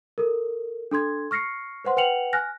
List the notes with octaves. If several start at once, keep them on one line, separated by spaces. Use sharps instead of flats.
A4 A#4
D4 A4 C6 G#6
C#6 F6 A#6 C7 C#7
B4 C5 F#5 C6
B4 F#5 G5 C#7 F7 F#7
G#5 F6 F#6 A#6